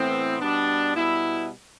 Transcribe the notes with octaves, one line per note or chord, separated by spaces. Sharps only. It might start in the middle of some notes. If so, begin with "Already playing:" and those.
Already playing: A2 E3 B3 C4
B2 G3 B3 D4
B2 G3 B3 E4